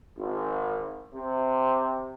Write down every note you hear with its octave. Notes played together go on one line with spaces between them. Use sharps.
G#1
C3